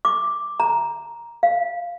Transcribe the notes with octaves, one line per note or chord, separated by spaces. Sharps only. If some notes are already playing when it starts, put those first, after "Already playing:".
D6
A#5
F5